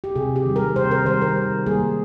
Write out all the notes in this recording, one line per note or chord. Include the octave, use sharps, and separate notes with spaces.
G4
C3 G#4
G4
D#3 G3
A#4
C3 C5
A#4
D#3 G3 C5
A#4
D#3
G3 A#3 G#4